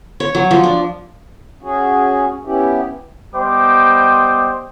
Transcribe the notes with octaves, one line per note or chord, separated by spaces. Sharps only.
C#5
F#3
F3
D4
C#4 F#4 G#4
B3 C#4 E4 G4
G3 B3 C5 D#5 G5 D6